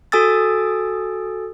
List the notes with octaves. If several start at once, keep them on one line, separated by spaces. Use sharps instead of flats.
F#4 A4 G#5 D#6 E6 A6